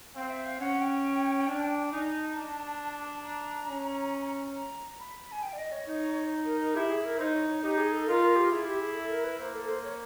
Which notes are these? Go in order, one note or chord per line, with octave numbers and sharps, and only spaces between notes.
C4 F5
E5
F5
C#4 F#5
G5
D4
D#4 G#5
A5
D4
A#5
C#4
A#5
B5
G#5
G5
D5
D#5
C#5
D#4
A#4
A#4
E4 G4
G#4
A#4
D#4 C5
C#5
C#5
D#4 G4
G#4
A4
F4 A#4
A#4
G4
E4 G#4
G4
G#4
A4
A#4
B4
A#3 C5
A4
C5
C#5